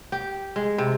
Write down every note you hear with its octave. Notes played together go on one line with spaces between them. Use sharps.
G4
G#3
C3